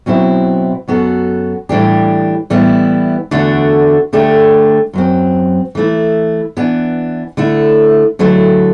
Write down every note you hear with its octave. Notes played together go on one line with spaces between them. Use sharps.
B2 F#3 C4 E4
F#2 F#3 B3 F#4 A4
A2 E3 G3 D4 G4
A2 E3 G3 B3 E4
E2 D3 A3 D4 F#4
D3 A3 D4 G4
F#2 F#3 C4
E3 A3 E4
E3 B3 D4
D3 A3 E4
D3 F#3 A3 E4